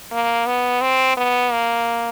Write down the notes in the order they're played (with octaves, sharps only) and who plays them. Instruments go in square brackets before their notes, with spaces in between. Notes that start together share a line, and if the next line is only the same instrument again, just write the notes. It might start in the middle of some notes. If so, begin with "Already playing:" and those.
[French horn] A#3
B3
C4
B3
A#3